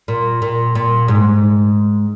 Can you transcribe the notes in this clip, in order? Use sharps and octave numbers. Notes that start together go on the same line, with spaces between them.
A#2
A#2
A#2
G#2